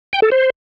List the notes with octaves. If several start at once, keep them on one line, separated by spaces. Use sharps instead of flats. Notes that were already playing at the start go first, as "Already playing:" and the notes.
G5
A4
C5